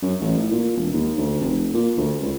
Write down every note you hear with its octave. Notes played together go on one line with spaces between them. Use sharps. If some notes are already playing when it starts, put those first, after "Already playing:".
F#2
A1
A2
A#2
E1
D#2
D2
F1
A#2
D2
C#2